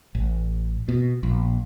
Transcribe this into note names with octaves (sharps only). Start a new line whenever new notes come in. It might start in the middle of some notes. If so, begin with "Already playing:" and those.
A1
B2
A#1